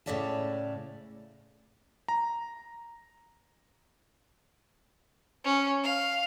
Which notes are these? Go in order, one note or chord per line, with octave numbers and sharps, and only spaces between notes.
A2 C#3 C#5 D5 E5 A5
A#5
C#4
F5